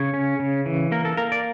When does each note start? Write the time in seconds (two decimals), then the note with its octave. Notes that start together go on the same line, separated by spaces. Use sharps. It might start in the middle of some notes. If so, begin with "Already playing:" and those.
Already playing: C#3 C#5
0.14 C#4
0.39 C#3
0.66 E3
0.92 A#3 A#4
1.05 A4
1.17 A#3 A#4
1.32 D5